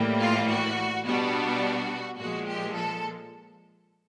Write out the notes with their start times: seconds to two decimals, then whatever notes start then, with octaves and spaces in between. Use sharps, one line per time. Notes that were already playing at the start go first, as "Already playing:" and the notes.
Already playing: A2 E3 G3 A#3
0.20 F4
0.49 F#4
1.05 B2 G3 B3 D4 F#4
2.19 A#2 F3 G#3 F#4
2.47 G4
2.75 A4